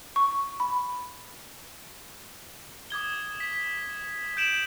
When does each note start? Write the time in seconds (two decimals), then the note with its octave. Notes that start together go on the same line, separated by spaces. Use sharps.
0.16 C#6
0.60 B5
2.90 D6 D#6 G#6 G7
3.40 B6
4.37 G6 D7 E7 F#7